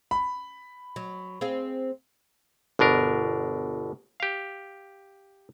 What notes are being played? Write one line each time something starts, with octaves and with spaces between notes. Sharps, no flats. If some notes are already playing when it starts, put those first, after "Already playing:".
B5
F#3
C4 G#4 F5
G1 B2 D4 A#4
G4 F5